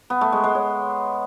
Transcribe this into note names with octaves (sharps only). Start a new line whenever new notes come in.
B3
A3
G#3
G#3
C#5